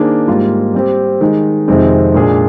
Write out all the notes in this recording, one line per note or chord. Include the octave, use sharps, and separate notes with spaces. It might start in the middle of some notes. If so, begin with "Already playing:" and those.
Already playing: D#3 A#3 D4 G#4 C5
G#2 G3 A#3 F4
G3 C4 G4
D#3 G#3 D#4
F2 C3 D#3 G#3 C4
A#2 G#3 D4 G#4